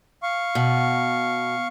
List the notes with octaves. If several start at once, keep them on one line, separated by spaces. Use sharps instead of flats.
F5 C#6
B2